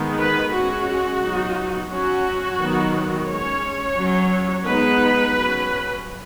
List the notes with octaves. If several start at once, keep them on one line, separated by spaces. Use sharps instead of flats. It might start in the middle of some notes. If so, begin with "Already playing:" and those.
Already playing: D#3 G#3 B3
B4
G#3 C#4 F#4
F#3 B3 D#4
F#3 C#4 F#4
D#3 F#3 B3
G#3 C#4 C#5
F#3 C#4
G#3 B3 D#4 B4
F#3 C#4